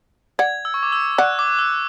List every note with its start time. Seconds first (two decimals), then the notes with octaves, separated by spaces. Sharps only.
0.39 D5 F#5 G#6
0.65 E6
0.74 C#6
0.83 D6
0.92 E6
1.18 D5 F#5 F#6
1.39 D6
1.59 E6